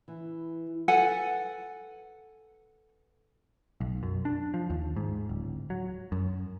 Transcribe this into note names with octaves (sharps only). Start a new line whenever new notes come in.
E3
A4 B4 F#5 G#5
B1
F#2
D4
F3
D#2
G#2
D1
F#3
F#2